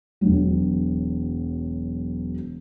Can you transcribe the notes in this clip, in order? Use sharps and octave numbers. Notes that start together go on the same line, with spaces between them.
E1 F#3